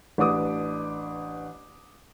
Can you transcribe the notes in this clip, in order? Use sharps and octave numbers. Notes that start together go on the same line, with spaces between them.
A1 D4 B4 D6 D#6